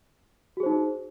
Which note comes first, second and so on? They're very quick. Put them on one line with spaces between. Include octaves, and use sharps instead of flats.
F#4 G#4 C5 D#4